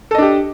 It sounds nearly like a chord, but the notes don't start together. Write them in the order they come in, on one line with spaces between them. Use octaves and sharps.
A4 D#5 D4 G4